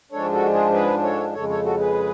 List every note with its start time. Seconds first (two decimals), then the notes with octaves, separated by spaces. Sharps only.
0.12 G#2 F3 G#3 D4 A4 C#5
0.32 F#4 A4
0.53 F4 G#4
0.73 G#4 B4
1.03 A4 C#5
1.34 F2 C#3 G#3 A4 C#5
1.49 A4 C#5
1.65 F#4 A4
1.79 G#4 B4